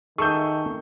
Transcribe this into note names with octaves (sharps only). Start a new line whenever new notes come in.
D#3 G#4 A4 E5 C#6 G6